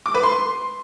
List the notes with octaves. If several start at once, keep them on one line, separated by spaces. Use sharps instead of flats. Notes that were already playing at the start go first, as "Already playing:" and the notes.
D6
B4
C6